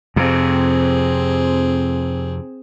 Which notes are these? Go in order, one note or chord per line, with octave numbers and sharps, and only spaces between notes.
F2 C3 C4 G#4